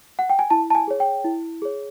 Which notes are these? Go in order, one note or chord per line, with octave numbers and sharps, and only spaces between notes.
F#5
G5
G#5
E4 A5
A5
G#5
G#4 C#5
G5
E4
G#4 C#5